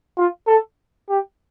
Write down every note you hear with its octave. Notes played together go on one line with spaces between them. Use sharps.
F4
A4
G4